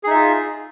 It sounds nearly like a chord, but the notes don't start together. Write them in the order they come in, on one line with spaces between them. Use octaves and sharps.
G#4 D#4 E5 F4